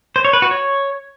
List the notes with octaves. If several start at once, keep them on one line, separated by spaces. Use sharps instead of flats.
C5
C#5
B4
F#4
C#5